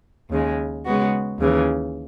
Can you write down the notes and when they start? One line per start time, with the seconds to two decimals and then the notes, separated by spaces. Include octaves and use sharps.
0.31 D#2 C#3 G#3
0.85 C#3 G#3 B3 F#4
1.39 D#2 C#3 E3